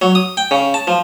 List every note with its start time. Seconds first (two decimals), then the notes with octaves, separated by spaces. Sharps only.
0.02 F#3
0.15 D#6
0.37 G5
0.51 C#3
0.74 A5
0.87 F3